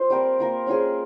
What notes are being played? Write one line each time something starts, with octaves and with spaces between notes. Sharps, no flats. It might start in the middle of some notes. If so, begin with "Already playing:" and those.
Already playing: F4 C5
G3 C4 G4 A#4
A#3 F4 A#4
G3 C#4 F4 G#4